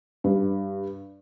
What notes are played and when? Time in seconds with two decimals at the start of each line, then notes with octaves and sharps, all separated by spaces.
0.24 G2